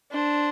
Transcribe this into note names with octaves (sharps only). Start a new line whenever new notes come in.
D4 C5